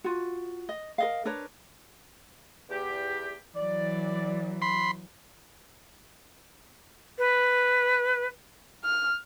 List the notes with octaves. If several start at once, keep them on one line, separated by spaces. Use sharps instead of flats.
F4 F#4
D#5
A#4 D#5 F5
D4 A#4 B4 C#5
E2 G4
E3 F#3 D5
B5 C6
B4
F6